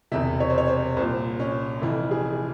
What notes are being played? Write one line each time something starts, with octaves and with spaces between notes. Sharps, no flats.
E1 E2 C3 E5
C#5
C5
C#5
C5
C2 A#2 C5
C#4
F1 F2 E3 E4
G#4